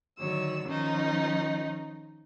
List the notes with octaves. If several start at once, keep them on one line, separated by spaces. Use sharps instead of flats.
D3 D#3 F#3 C#5 E6
D#3 F3 C#4 D#4